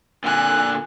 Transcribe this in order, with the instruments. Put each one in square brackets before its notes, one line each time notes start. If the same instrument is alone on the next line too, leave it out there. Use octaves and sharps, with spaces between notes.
[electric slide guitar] A#2 D3 [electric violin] G#5 F#6